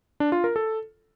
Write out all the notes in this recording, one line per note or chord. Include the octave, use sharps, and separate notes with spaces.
D4
F4
A#4
A4